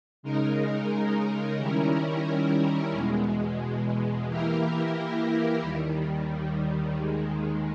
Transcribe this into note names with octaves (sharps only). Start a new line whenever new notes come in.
C#3 G#3 D#4 A#4
D#3 G3 C#4 E4 A#4
E2 B2 G#3
E3 A#3 E4 G4 A#4
D#2 D#3 G3
D#2 D#3 G#3